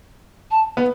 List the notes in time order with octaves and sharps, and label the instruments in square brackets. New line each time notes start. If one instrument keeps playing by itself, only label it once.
[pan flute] A5
[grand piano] B3